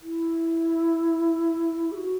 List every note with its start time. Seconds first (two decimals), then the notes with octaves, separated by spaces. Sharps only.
0.02 E4
1.91 G#4
1.95 F#4